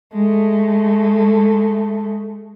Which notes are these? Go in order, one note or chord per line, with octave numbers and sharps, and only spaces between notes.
G#3 A3